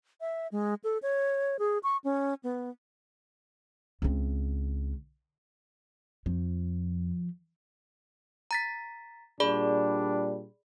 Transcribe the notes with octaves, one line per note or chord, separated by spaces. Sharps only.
E5
G#3
A4
C#5
G#4
C#6
C#4
B3
C#2 C4
F2 F3
A#5 A6 B6
A#2 G3 D4 G#4 D5 B5